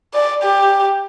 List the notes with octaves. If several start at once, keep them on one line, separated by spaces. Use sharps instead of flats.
D5
G4